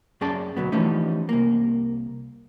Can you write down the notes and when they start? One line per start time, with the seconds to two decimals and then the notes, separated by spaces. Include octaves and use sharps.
0.21 F#2 C#4 G#4 D5 A5
0.57 D2 B2 F#3 B3
0.72 E3 F3 G3 A3 C#4 D#4
1.29 C2 A#3